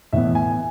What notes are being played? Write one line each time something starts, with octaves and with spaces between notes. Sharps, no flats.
A2 E3 B3 E5
G#5